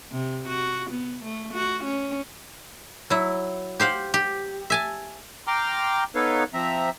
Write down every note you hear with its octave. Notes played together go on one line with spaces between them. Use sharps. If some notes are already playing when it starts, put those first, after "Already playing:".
C3
F#4
B3
A3
F#4
C#4
F#3 E4
G4 C5 F5 F#5
G4
E5 G#5 A5
G5 A#5 C6 D6 F6
B3 D#4 A4 B4 C#5 F5
F3 C4 E5 A#5